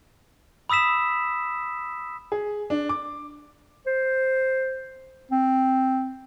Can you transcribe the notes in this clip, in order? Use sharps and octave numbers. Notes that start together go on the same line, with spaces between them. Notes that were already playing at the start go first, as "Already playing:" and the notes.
B5 D#6 E6 B6 E7
G#4
D4
D6
C5
C4